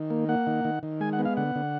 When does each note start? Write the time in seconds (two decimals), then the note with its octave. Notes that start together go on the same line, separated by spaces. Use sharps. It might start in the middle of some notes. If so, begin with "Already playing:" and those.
Already playing: D#3
0.10 A#3
0.29 A#3 F#5
0.47 D#3
0.65 D#3
0.83 D#3
1.01 G#3 G#5
1.13 F#5
1.19 B3
1.25 F5
1.37 D3 F#5
1.55 D3